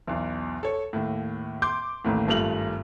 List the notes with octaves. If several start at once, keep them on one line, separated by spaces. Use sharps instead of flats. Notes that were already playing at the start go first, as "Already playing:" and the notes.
B1 E2
A4 C#5
D#2 A2
C6 D6 G6
A1 D#2 A2
G#1 G2 A3 F4 F7 F#7